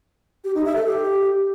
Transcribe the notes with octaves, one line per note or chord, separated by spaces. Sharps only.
G4
D#4
E5
A4
G4